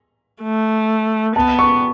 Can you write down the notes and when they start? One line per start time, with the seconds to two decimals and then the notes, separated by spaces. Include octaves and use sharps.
0.42 A3
1.36 B3 A5
1.59 C#6